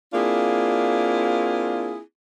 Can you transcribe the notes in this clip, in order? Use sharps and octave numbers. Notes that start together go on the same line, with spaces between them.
A#3 C4 D4 E4 F4 G#4